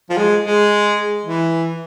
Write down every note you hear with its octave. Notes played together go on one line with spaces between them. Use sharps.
F3
G#3
G#3
E3